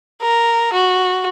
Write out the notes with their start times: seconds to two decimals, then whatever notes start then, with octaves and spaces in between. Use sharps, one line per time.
0.22 A#4
0.73 F#4